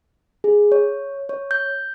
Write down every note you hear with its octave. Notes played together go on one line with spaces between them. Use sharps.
G#4
C#5
C#5
G6